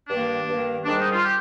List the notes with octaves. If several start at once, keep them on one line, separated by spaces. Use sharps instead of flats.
G2 D#3 A#3 D4
G2 D#3 A#3
G#2 D#3 G3 D4
D#4
F4
G4